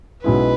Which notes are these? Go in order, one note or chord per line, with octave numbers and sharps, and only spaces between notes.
B1 B2 G#3 C#4 E4 B4